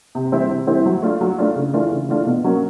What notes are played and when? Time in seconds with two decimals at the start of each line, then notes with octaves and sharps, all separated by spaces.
0.15 C3
0.32 E3 G3 C4 E4
0.50 C3
0.67 E3 G3 C4 E4
0.86 F#3
1.02 A3 D4 F4
1.21 F#3
1.38 A3 D4 F4
1.56 C#3
1.73 E3 A3 D4 F4
1.91 C#3
2.09 E3 A3 D4 F4
2.26 B2
2.44 F#3 A#3 C#4